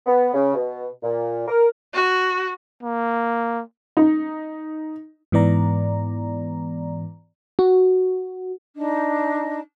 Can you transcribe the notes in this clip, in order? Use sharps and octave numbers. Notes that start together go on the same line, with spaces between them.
B3
C#3
B2
A#2
A#4
F#4
A#3
D#4
G#2 E3 B3 D5 A#5
F#4
D4 D#4 D#5